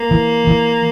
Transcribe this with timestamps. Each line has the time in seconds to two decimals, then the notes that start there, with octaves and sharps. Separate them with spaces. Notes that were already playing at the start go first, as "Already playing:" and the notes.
Already playing: A#3
0.11 E3
0.47 E3